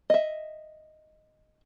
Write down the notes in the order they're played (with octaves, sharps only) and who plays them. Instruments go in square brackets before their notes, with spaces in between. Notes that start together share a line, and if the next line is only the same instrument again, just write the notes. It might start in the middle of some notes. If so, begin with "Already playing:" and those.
[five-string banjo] D#5 E5